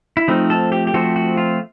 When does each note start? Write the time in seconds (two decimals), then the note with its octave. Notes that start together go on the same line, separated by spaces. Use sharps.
0.17 E4
0.28 F3 A3 C4 D#4
0.50 A4
0.72 G4
0.87 G4
0.94 F3 A3 C4 F#4
1.16 F#4
1.37 F4